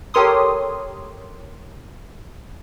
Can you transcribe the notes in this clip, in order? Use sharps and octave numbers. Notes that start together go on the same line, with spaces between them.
G4 A4 A#4 C#5 C6 D#6